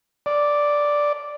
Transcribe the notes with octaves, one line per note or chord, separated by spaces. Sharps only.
D5